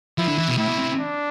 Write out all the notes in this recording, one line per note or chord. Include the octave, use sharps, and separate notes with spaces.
F3 E4
D3
E3
B2
A2 E4
B2
C3
D4